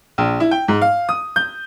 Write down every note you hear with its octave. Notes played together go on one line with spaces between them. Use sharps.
A#1
E4
G5
G#2
F5
D#6
G6